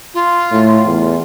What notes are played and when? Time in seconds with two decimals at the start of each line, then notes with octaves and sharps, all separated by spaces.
0.14 F4
0.52 A2
0.87 E2